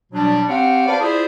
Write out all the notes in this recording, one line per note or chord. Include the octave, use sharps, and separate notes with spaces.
B2 F#3 G3 D4
C4 G4 C#5 F5 F#5
B4 C5 D5 F5 A5
E4 F4 G#4 C5 D5